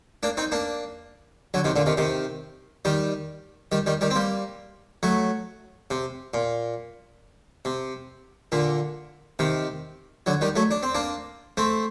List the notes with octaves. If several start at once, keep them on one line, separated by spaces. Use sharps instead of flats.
A#3 D4
C4 D#4
A#3 D4
D3 F#3
C3 D#3
A#2 D3
C3 D#3
C3 D#3
D#3 G3
D#3 G3
D#3 G3
D#3 G3
C4
G3 A#3
F#3 A3
C3
A#2
C3
A#2 D3
C3 D#3
D3 F#3
D#3 G3
F#3 A3
D4
C4
A#3 D4
A3 C4